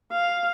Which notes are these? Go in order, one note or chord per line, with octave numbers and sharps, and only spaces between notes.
F5